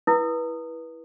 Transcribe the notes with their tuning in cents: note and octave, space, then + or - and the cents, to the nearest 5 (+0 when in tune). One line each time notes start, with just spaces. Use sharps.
E4 +0 B4 -25 D#6 -15